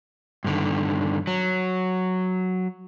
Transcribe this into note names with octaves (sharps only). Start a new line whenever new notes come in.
G2 D3 D#3
F#3